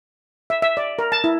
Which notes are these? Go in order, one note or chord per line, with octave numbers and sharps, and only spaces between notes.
E5
E5
D5
A#4
A5
E4